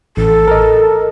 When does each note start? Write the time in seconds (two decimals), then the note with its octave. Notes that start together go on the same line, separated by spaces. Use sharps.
0.17 A1 A4
0.48 A#4 D#5